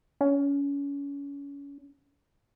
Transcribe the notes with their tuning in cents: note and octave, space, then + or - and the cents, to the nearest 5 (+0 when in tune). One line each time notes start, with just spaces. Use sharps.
C#4 +30